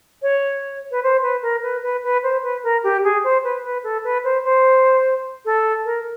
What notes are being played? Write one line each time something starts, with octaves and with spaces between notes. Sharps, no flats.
C#5
B4
C5
B4
A#4
B4
B4
B4
C5
B4
A#4
G4
G#4
C5
B4
B4
A4
B4
C5
C5
A4
A#4